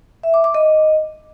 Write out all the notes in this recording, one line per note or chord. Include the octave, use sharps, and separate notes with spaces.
E5
D6
D6
D#5